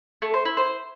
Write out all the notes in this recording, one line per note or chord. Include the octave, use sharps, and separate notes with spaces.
A3
C5
E4
C5